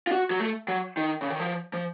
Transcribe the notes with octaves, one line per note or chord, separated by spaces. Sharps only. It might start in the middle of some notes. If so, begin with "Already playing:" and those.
F4
F#4
F#3
A3
F#3
D#3
C#3
D#3
F3
F3